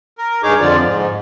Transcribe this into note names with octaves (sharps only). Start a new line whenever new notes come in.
A#4
G2 D#4 G#4 C#5 D6
F2 D3 F3 F4 D5
G#2